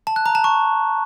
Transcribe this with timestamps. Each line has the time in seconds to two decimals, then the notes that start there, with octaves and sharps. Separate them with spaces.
0.07 A5
0.16 F#6
0.26 A#5
0.35 A5
0.44 C#6